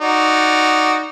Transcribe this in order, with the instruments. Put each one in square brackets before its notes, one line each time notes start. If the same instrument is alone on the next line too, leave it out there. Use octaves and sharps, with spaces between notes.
[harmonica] D#4 F#4 D5